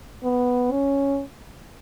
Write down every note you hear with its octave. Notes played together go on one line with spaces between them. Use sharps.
B3
C#4